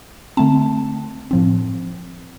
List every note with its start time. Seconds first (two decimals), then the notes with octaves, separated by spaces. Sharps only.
0.37 D3 A3 C4 A5
1.31 A2 F3 C4